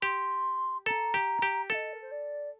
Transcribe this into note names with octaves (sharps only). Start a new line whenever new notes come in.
G4 C6
A4 A#5
G4
G4
A4 D#5 F5
A#4
C5
D5